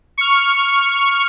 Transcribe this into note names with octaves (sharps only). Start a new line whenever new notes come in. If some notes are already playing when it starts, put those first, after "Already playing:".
C#6 F6